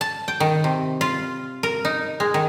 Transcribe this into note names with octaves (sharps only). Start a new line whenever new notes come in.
A5
G5
D#3
C3
F4
A#4
D#4
G#3
D#3